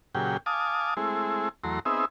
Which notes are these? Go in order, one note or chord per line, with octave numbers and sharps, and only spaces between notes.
A#2 C#3 F#3 G4 G#4 G5
F5 G#5 A5 D6 D#6
G#3 A3 C4 E4 G#4
E2 F#3 A3 A#5 C6
B3 C4 D#4 G#4 E5